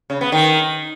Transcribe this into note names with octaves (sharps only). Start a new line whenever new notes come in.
C#3
B3
D#3